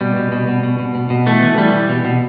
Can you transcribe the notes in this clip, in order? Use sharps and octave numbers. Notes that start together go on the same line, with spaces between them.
B2 G3
B2
B2
B2
B2
B2
B2
B2
E3 A3
E3
E3 G3
E3
B2
B2